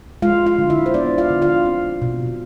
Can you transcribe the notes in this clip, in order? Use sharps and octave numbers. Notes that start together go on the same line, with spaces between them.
G#3 F4 F5
F4 F5
D3
E4 E5
C5
B3 D4 D5
F4 F5
D3
F4 F5
C4
B2